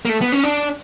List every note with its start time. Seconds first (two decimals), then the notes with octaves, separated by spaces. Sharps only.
0.05 A#3
0.09 A3
0.21 B3
0.32 C#4
0.43 D4